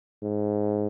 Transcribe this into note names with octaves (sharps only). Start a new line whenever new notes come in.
G#2